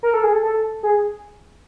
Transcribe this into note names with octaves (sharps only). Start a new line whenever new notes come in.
A#4
A4
G#4
A4
A4
G#4